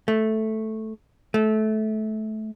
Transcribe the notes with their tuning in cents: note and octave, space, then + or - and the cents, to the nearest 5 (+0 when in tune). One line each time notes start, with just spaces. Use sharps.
A3 -5
A3 -20